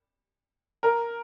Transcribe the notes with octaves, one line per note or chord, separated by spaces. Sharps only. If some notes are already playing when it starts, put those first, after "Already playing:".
A#4